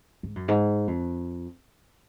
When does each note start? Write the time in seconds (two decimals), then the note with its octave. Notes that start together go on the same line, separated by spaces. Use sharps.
0.23 G#2
0.36 F#2
0.48 G#2
0.87 F2